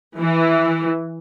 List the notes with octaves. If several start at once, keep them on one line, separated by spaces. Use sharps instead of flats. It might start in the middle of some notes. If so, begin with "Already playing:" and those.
E3